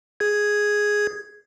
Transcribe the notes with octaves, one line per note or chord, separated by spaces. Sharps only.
G#4 G#6